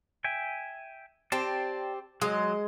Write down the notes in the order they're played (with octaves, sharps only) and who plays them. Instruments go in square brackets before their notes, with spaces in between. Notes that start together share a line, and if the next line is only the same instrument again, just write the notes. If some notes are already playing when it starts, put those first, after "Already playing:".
[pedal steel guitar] E5 G5 G#5
[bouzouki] C4 G4 [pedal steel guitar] D5 A5 C6
[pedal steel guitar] F#3 [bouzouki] G#3 D#5